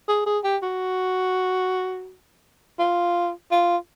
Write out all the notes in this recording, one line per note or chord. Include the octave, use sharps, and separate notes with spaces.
G#4
G#4
G4
F#4
F4
F4